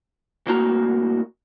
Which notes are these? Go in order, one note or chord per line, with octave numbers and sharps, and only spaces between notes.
C2 A2 A#3 F#4 A#5